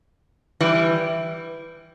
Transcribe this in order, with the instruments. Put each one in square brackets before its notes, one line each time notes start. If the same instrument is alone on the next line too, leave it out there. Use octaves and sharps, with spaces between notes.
[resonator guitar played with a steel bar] E3 G3